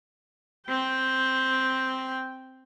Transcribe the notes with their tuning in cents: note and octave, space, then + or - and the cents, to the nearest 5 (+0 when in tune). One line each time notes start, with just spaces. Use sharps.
C4 +0 G5 +0